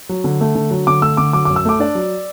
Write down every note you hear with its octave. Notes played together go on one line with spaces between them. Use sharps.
F#3
D3
A3
D3
F#3
D3 D6
A3 E6
D3 D6
F#3 D6
D6
F#2
E6
A3 D6
D4 D5
F#3